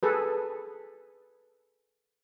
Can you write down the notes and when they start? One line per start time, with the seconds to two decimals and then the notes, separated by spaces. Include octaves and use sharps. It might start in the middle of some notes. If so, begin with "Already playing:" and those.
0.03 G#4 A4 B4